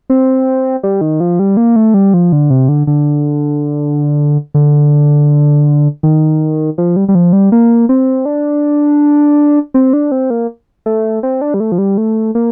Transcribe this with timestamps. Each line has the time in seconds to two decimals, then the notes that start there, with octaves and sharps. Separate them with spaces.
0.10 C4
0.83 G3
1.01 D#3
1.20 F3
1.39 G3
1.57 A#3
1.76 A3
1.94 G3
2.14 F3
2.32 D3
2.50 C3
2.69 D3
2.87 D3
4.54 D3
6.03 D#3
6.78 F3
6.96 G3
7.09 G3
7.15 F3
7.33 G3
7.52 A#3
7.89 C4
8.25 D4
9.74 C4
9.93 D4
10.12 C4
10.30 A#3
10.86 A3
11.23 C4
11.41 D4
11.54 G3
11.60 A3
11.72 F3
11.78 G3
11.98 A3
12.35 A#3